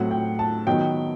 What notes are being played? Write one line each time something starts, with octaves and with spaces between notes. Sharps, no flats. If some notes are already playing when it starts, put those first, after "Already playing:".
Already playing: A2 F#3 C4 F#5
G5
A5
D#3 F#3 B3 G5